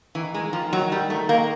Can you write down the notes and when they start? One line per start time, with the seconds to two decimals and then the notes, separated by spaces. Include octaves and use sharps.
0.15 D#3 E3
0.34 D#3 G#3
0.53 D#3 F3
0.72 D#3 F#3
0.91 D#3 G3
1.10 D#3 A3
1.29 D#3 A#3